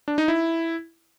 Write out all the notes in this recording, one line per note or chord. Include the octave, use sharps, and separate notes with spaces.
D4
D#4
E4